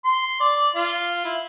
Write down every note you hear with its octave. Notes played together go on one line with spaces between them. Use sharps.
C6
D5
F4
E4